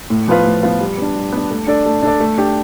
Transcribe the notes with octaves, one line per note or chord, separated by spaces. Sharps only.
A2
F3 B3 F4 B4
A2
F3 B3 F4 B4
G3
B3 D4
G3
B3 D4
A3
D4 A4 D5
A3
D4 A4 D5
A3
D4 G4